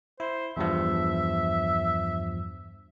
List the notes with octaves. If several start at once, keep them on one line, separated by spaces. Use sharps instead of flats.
E4 C5
E2 G2 F3 E5